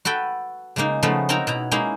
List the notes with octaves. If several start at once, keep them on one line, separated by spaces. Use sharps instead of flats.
F#4 A4 B4 G5
C#3 G#3 A#3 D#4
C#3 F3 A3 B3 C#4 D#4
C4 D#4 F#4 A#4 C#5 A#5
B2 E4 A#5
G#3 A#3 C#4 D#4 E4